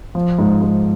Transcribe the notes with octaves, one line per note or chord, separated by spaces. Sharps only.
F3
G#2
G#2